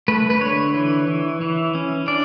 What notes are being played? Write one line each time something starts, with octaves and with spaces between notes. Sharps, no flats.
A3 B4
B4
D3 C#5
E3
E3
E3
C#4
D4 D5